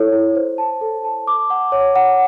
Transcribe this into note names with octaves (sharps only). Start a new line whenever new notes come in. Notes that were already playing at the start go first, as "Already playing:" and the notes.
Already playing: E4 A4 C#5
E4
C5
A5
A4
A5
D6
F#5
C#5
F#5